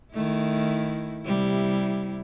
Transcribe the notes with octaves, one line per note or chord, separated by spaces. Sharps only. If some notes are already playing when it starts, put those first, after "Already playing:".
D#3 A3 E4
C3 G3 E4